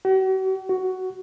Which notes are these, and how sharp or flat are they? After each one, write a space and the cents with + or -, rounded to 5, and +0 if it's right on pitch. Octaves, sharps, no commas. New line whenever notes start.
F#4 +45
F#4 +10